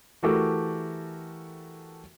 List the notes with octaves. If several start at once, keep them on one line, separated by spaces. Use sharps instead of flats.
E3 A3 F#4 G4 A4 A#4